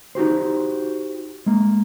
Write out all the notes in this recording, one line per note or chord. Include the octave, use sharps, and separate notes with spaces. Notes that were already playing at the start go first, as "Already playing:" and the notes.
D#4 F#4 G4 C5
G#3 A#3